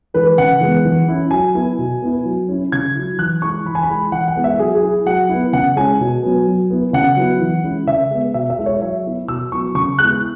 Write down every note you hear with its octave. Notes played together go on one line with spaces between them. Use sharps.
E3 G#3 B4
C#3 F#5
E3 G#3 B3
E3
C#4 E4
F#3 G#5
B3 E4
B2
B3 E4
F#3
C#4 E4
C#3 G#6
F#3 E4
E3 F#6
G#3 E4 C#6
E3 B5
G#5
B5
G#3 E4
E3 F#5
F#5
G#3 B3 E4
E5
F#3 G#4
G#4
E4
F#3 F#5
B3 E4
C#3 F#5
G#3 C#4 E4 G#5
B2
F#3 B3
F#3
B3 E4
C#3 F#5
F#3 B3 E4
E3
G#3 C#4 E4
C#3 E5
G#3 B3
B2 E5
E5
G#3 E4
C#5
F#3 E5
B3 E4
B2 E6
F#3 B3 E4 C#6
C#3 C#6
G#3 B3 E4 F#6